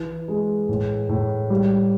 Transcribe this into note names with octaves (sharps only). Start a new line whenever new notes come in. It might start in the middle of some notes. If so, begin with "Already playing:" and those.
Already playing: E3
G#3
A2
A2
G3